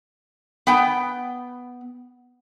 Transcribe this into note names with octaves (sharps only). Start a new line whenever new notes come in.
B3 G5